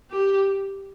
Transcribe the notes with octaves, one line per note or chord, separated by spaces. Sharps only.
G4